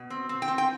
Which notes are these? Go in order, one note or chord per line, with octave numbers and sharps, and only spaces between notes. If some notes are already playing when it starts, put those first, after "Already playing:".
Already playing: B2
C4
C4
G5
C4
G5